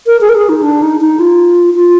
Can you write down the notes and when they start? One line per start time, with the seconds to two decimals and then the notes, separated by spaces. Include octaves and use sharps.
0.07 A#4
0.21 G#4
0.29 A#4
0.35 G#4
0.49 D#4
0.63 D4
0.82 D#4
1.01 D#4
1.20 F4
1.74 F4